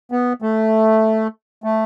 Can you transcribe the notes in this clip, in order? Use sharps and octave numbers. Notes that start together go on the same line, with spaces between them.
B3
A3
A3